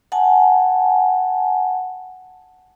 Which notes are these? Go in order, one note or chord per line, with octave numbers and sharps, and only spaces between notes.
F#5 G#5 A5